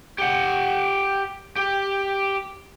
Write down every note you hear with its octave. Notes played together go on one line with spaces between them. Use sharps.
G4 F#5
G4